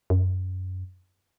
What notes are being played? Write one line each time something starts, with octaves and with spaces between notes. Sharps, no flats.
F#2